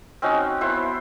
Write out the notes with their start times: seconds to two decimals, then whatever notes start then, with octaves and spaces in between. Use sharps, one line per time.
0.22 C4 C#4 D#4 F#4
0.61 B3 E4 C5 F#5